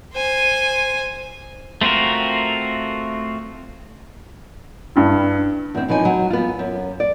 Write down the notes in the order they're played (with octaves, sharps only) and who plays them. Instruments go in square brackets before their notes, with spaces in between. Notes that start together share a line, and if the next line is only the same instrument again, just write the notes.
[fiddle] C5 G#5
[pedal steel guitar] A3 C4 F4 F#4 A#4
[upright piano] G2 E4
[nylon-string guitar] E2 C4
F#2 E3 F3 D#4 G#5
F#3
B3 F4
F#2
D5